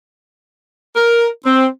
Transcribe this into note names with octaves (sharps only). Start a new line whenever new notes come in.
A#4
C4